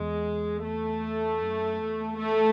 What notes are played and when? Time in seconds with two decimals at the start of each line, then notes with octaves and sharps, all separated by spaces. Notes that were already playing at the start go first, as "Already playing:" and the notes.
Already playing: E2 G#3
0.64 A3
1.42 F#2
1.80 E2
2.19 A3